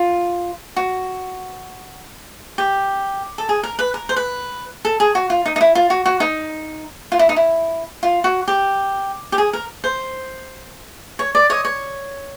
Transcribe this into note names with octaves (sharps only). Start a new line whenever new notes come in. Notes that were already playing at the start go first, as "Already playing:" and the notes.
Already playing: F4
F#4
G4
A4
G#4
A#4
B4
A#4
C5
B4
A4
G#4
F#4
F4
D#4
D#4
E4
F4
F#4
F#4
D#4
F4
E4
D#4
E4
F4
F#4
G4
G4
G#4
A#4
C5
C#5
D5
C#5 D#5
C#5